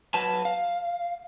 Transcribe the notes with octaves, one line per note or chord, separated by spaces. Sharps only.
F#3 B4 A5
F5